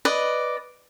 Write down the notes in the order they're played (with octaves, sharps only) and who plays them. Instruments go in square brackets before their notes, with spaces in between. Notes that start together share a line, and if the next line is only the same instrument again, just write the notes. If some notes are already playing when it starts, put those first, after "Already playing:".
[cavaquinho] B4 D5 D#5